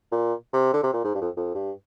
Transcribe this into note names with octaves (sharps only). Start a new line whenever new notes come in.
A#2
C3
D3
C3
A#2
G#2
G2
F2
F2
G2